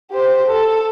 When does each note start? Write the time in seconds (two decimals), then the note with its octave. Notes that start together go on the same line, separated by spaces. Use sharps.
0.11 G4 C5
0.47 A4